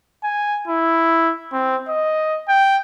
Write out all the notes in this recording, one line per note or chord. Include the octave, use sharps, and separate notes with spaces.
G#5
E4
C4
D#5
G5